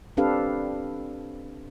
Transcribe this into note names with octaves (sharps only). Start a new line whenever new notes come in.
C4 D4 G4 A4 B4 F5